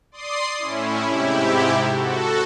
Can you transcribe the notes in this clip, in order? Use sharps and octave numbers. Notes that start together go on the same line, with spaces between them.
D5 C6 D#6 C7
A2 C#4 E4
G#2 C3 E4 G4
F#4 A4